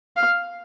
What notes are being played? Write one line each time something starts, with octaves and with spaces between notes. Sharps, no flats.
F5